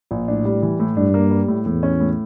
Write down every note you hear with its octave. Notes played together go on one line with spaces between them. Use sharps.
A#1
A2 D4
G3
E3
A2
G2 D4
A#3
G3
A2
E2 A2
C#4
A2